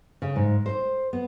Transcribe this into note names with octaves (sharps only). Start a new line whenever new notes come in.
C#3
G#2
C5
B3